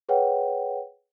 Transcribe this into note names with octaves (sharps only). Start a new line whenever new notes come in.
G#4 B4 C#5 F#5 G5